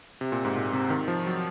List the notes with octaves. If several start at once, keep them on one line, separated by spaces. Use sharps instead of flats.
C3
A#2
G#2
A#2
C3
D#3
F3
F#3